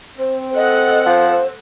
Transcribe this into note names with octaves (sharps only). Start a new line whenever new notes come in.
C4 C5
A4 D#5 F#5
F3 C5